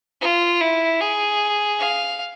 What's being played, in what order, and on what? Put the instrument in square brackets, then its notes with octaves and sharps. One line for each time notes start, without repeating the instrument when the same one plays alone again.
[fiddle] F4
E4
G#4
F5